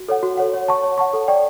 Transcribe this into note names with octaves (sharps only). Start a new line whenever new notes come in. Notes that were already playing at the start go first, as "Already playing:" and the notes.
Already playing: F#4
A4 C#5 F#5
F#4
A4 C#5 F#5
C#5
F#5 A5 C#6
C#5
F#5 A5 C#6
A4
D5 G5 C#6